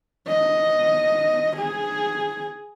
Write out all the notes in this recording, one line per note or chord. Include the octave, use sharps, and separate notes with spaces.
D#5
G#4